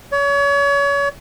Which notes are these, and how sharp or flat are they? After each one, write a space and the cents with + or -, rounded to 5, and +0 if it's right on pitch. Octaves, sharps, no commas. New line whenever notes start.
C#5 +35